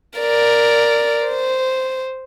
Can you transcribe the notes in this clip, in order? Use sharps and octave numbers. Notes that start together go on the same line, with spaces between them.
A#4 D5
C5